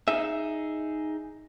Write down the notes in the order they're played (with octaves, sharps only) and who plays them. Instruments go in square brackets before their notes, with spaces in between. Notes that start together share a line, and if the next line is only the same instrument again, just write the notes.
[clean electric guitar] D#4 G#4 E5